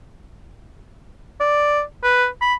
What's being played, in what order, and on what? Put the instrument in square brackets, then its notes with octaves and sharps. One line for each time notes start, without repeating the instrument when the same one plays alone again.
[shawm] D5
B4
B5